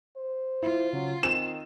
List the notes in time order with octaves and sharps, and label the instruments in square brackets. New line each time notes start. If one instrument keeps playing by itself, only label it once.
[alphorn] C5
[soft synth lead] E4 [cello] F4
[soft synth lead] C#3 [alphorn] F#3
[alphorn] D#3 [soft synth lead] C4 [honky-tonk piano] E7